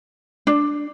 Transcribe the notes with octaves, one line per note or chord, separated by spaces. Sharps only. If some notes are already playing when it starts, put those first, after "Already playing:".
D4